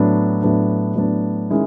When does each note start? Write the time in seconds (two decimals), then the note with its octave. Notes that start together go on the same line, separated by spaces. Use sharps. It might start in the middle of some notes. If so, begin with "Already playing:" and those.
Already playing: A2 F#3 B3 D4
0.42 A2 F#3 B3 D4
0.96 A2 F#3 B3 D4
1.50 D#3 G#3 C#4 E4